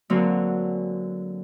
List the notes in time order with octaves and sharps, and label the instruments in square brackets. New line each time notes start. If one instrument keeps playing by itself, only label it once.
[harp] D3 F#3 G#3 A#3 C4